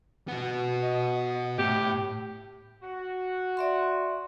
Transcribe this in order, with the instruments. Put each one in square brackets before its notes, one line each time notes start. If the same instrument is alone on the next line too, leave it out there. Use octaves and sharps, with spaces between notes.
[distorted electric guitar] B3 F#4
[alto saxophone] D#5
[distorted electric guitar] A2 [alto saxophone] G4
[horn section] F#4
[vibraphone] D5 E5 C6